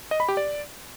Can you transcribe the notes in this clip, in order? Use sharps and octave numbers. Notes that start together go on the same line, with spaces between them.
D#5
B5
G4
D5